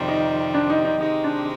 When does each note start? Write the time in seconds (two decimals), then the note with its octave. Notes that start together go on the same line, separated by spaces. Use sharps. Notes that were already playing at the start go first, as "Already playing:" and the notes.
Already playing: F2 C3 D#3 G3 C4
0.08 D#4
0.54 D4
0.70 D#4
0.85 D#4
1.00 C3 D#3 G#3 C4 D#4 G4
1.24 D4